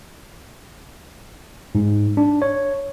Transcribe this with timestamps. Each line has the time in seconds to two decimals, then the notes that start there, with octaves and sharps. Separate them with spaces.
1.75 G#2
2.17 D4
2.42 C#5